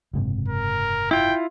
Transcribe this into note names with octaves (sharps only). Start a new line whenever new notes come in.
F#1 G#2 C3
A#4
E4 F4 G5